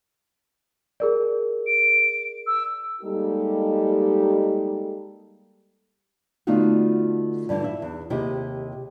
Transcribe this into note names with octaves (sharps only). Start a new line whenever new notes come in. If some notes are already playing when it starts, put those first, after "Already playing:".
G#4 A#4 D5
D7
E6
G3 G#3 A#3 D#4 G4 A4
D3 A3 B3 D#4 F4 F#4
G2 D3 E3
E4 E5
E2
D#2 C3 E4 G4 G#4 D#5